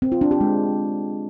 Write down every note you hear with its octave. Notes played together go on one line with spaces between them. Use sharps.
C4
F4
D4
G4
G#3